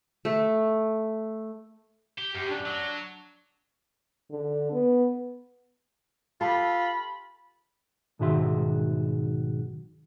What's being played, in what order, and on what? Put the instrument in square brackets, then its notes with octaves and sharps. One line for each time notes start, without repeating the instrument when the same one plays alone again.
[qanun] A3
[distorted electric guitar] G4
[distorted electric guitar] F#2 [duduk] G4
[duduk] D4
[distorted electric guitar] F#3
[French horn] D3
B3
[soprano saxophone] F4 [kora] G4 A4 E5 [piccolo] B5
[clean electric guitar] B1 G#2 D#3 F#4 E5 C6